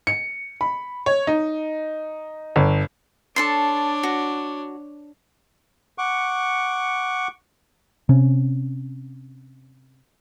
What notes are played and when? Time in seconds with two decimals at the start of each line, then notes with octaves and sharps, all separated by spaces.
0.07 C#7
0.61 B5
1.06 C#5
1.27 D#4
2.56 G1
3.36 D4 A4 C#5 A5 C6
4.03 F#4
5.98 F#5 C#6 D6
8.09 C3 C#4